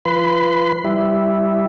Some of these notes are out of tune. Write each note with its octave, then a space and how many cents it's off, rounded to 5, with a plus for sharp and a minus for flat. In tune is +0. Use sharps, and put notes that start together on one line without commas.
F3 -30 B4 +0 C6 -35
G3 +0 E4 +0